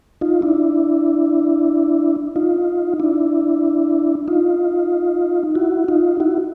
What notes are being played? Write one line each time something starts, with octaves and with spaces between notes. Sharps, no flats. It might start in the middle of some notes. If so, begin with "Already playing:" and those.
D#4 F4
D4 E4
D#4 F4
D4 E4
D#4 F4
E4 F#4
D#4 F4
E4 F#4